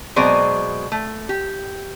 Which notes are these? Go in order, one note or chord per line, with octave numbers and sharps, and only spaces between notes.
B2 F#3 G#3 C4 C5 D5
A3
G4